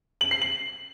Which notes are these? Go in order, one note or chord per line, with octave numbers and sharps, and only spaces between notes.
F#7
C7
F#7